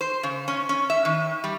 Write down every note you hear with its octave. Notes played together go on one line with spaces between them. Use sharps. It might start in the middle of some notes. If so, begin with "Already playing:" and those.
C5
C#3
C#4
C#4
E5
D#3
G3